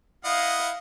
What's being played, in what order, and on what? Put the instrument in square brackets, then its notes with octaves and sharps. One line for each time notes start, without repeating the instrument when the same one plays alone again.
[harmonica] E4 D#5 F#5 [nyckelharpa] F5